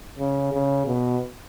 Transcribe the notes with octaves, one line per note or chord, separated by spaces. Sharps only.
C#3
C#3
B2